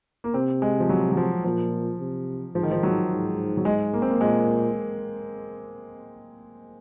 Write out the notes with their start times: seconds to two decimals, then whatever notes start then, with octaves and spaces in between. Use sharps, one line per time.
0.24 A#3
0.34 C3 C4
0.62 G#3
0.80 F3
0.89 F#3
1.12 F#3
1.17 F3
1.44 A#2 F3
2.00 C3
2.55 G#2 F3
2.63 D#3
2.72 F3
2.83 F#3
3.11 G#2
3.57 F#3
3.65 G#3
3.93 A#3
4.02 C4
4.11 A#3
4.21 A#2 G#3